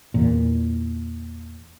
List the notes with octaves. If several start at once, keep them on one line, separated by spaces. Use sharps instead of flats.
E2 A#2